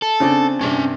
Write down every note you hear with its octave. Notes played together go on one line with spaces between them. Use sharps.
A4
C#3 C4 D4
G2 C3 C#4 A5